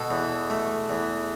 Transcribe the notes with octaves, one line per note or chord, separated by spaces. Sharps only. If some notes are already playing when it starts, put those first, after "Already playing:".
Already playing: B2 A4
E2
A3
E2